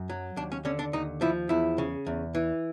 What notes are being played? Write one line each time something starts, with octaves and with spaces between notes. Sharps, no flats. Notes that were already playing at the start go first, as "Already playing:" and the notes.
Already playing: F#2
F#3
D#2 D4
C#4
D3 C#4
D4
D#2 D#4
F3 E4
E2 E4
C#3
E2
E3